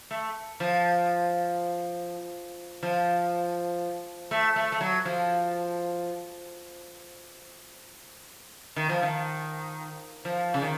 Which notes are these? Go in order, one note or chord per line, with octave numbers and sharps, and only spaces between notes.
A3
F3
F3
A3
A3
A3
F#3
F3
D#3
F3
D#3
F3
C#3
D#3